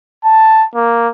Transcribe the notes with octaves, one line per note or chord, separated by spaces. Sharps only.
A5
A#3